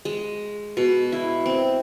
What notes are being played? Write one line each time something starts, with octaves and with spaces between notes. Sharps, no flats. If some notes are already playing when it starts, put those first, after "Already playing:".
G#3
B2
E4
C4